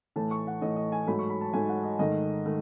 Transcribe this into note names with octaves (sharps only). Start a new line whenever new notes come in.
A2 E3 A3 A5
C#6
F#5
A2 E3 A3 D#5
D#5
G#5
G#2 F#3 A3 B5
C#6
B5
A5
G#2 F#3 A3 G#5
F#5
D#5
G#2 D#3 A3 D#5
D#3 A3